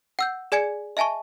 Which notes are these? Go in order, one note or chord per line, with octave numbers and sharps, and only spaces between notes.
F#5 E6 G6
G#4 D5 G#5 G#6 C#7
D#5 E5 G#5 A5 C#6